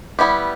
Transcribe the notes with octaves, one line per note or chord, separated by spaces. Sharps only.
G3 B3 E4 G4